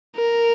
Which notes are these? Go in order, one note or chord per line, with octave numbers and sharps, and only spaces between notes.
A#4